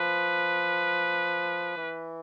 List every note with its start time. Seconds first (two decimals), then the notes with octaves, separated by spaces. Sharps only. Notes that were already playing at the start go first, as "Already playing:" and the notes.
Already playing: F3 B4
1.77 E3